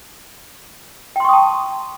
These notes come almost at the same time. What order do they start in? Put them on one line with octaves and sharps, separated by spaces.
G5 C6 C#6 D#6 A5